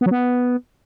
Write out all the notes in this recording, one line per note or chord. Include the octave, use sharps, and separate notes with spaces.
B3
F#3
B3